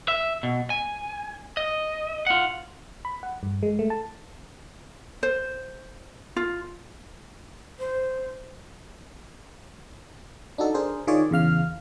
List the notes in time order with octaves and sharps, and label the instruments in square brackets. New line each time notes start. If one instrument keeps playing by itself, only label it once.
[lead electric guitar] E5
B2
G#5
D#5
F4 F#5
[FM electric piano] B5
F#5
G2
G#3
A3
A5
[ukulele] C5
F4
[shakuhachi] C5
[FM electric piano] D4 D#4 F#4 A4
D4 G#4 A#4 C5
D#3 F4 G#4 C#5 D5
E2 C#3 F5 F6